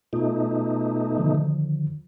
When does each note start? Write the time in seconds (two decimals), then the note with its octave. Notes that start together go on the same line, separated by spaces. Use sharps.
0.13 B2 A3 D#4 F4
1.18 D3 D#3 F3